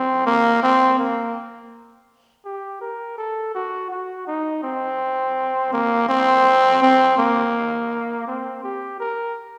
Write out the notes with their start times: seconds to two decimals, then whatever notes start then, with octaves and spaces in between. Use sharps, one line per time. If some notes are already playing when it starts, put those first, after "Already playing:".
Already playing: C4
0.26 A#3
0.63 C4
0.99 A#3
2.45 G4
2.81 A#4
3.18 A4
3.55 F#4
3.90 F#4
4.27 D#4
4.63 C4
5.73 A#3
6.09 C4
6.82 C4
7.18 A#3
8.27 C4
8.64 G4
9.00 A#4